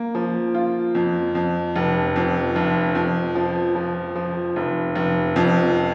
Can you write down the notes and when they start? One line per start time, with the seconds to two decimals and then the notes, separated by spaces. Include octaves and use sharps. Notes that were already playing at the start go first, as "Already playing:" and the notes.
Already playing: A#3
0.15 F3
0.54 F4
0.95 F2
1.35 F2
1.76 F1
2.16 F2
2.56 F1
2.95 F2
3.35 F3
3.75 F3
4.15 F3
4.56 F1
4.95 F1
5.36 F2